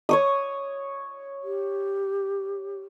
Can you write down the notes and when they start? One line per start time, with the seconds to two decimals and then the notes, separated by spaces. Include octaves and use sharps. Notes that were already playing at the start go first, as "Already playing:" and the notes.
0.09 C#5 C#6 D#6
1.43 G4